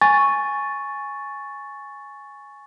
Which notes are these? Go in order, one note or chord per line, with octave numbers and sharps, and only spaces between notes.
G#5 C#6 A6